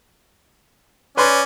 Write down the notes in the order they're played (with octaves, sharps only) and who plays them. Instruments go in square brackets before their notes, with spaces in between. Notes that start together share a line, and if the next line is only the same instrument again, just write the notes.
[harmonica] C#4 D5 [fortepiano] B4 C6